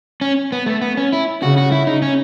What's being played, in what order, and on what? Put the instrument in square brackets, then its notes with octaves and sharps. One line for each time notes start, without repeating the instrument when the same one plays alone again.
[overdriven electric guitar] C#4
B3
A3
B3
C#4
E4
[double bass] C#3 [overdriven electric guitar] F#4
[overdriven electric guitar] F#4
E4
D#4
C#4